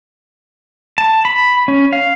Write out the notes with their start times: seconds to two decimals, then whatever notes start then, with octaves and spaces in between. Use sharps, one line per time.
0.98 A5
1.25 B5
1.68 C#4
1.93 F5